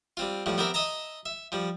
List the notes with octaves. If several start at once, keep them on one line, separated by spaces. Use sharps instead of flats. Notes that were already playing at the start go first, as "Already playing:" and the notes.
G3 C4 F4
A2 F3 G3
B3 C4 G4 A#4 E5
D#5 E5 A5 A#5
E5
F3 G3